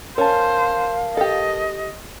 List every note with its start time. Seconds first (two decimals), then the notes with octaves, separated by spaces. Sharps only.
0.18 C#4 A#4 C5 F5 A5
1.17 G4 A4 D#5